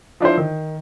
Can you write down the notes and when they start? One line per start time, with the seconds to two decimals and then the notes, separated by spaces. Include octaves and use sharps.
0.20 F3 D4 E4 C5
0.37 D#3